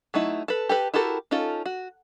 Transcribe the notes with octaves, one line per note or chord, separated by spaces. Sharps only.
F#3 A3 D#4 E4
A4 B4
G4 A4 B4
E4 F#4 G4 A4 A#4
C#4 D#4 F4 A4
F#4